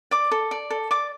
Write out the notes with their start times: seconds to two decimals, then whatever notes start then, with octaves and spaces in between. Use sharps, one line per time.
0.11 D5 D6
0.31 A4
0.51 D5
0.70 A4
0.91 D5 D6